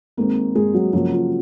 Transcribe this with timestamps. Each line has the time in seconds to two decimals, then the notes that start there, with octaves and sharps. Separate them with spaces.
0.17 D#3 G#3 A#3 C4 A#4
0.55 G#3 G#4
0.74 F#3 F#4
0.93 C#3 F3 F#3 A#3 F#4
1.12 F4